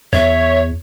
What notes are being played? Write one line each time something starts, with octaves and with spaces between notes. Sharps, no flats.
E2 C#5 E5